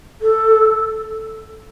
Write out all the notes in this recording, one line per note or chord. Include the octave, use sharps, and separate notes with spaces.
A4